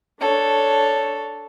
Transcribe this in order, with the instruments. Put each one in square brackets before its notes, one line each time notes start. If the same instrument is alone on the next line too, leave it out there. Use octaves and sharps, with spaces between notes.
[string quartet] D4 A4 C#5